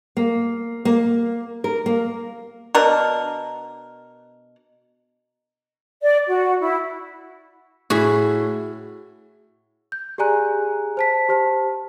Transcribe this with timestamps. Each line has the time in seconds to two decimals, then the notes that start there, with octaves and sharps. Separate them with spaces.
0.17 A#3
0.85 A#3
1.64 A#4
1.86 A#3
2.75 B2 D4 A#4
6.03 D5
6.28 F#4
6.60 E4
7.90 A2 F#4 G#4 B5
9.92 G6
10.18 G4 G#4 D5 G#5 A#5 F#6
10.97 C5 A5 B6
11.29 G4 C5 A5